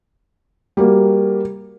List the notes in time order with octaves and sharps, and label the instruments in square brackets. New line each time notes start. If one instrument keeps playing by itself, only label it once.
[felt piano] G3 A#3 F#4